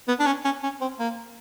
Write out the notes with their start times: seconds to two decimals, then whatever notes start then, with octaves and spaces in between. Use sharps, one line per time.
0.08 B3
0.20 D4
0.26 C#4
0.45 C#4
0.63 C#4
0.81 C4
1.00 A#3